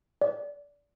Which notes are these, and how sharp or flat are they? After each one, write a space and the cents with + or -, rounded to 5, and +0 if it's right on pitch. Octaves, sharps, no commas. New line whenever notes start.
D5 -20